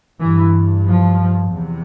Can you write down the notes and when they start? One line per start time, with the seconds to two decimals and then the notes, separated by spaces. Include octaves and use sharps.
0.20 G2 E3
0.87 F3
1.52 E2 C3